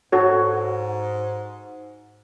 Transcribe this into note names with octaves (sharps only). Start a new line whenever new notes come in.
G#2 F#4 A4 C#5